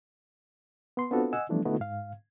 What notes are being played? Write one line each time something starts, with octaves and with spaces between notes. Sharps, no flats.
B3 C6
B3 C4 D4 F4 F#4 A4
D#5 F#5 G#5 E6
E3 F3 G3 A3 B3 D4
D3 A3 B3 D#4 E4 F#4
G#2 F5